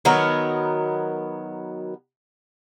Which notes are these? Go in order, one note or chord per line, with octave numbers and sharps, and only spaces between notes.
D#3 F#3 B3 A#4